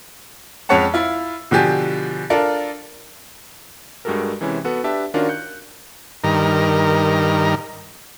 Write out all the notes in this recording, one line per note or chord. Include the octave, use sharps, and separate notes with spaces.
F2 G#3 C#4 C#5 F#5 A5
E4 F4
B2 D3 F3 G4 G#5
D4 F4 A4 A#4
G2 G#3 F#4 G4 A4 A#4
C3 E3 G#3 C#4 E4
B3 F#4 A4 B4 F#5
D4 G4 B4 E5 A5
D#3 C#4 D4 F4 F#4 A#4
F#6 G6 C#7
G2 D#3 A#4